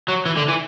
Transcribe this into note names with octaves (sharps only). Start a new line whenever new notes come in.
F#3
E3
D3
E3